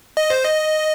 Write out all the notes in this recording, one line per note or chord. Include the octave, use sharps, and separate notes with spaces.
D#5
C5
D#5